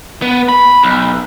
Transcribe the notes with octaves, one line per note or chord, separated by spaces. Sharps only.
B3
B5
B1